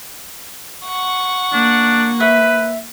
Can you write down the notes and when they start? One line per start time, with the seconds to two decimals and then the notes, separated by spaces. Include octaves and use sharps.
0.86 F#5 C#6
1.53 A#3 D4
2.20 B4 E5